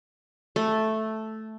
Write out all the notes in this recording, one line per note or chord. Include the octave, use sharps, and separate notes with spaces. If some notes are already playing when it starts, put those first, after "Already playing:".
A3